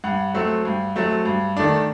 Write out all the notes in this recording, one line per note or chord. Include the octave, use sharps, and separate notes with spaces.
G2 F#5
F#3 A3 C4
G2
F#3 A3 C4
G2
D#3 A3 D4